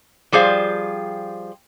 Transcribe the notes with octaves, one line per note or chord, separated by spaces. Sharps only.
F3 G3 G#4 C5 F5